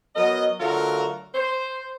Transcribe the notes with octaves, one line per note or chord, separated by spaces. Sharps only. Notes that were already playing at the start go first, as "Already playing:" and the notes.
F#3 B3 A#4 D#5
D3 F#3 A3 F4 F#4 A#4
C5